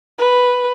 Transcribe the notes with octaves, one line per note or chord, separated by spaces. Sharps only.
B4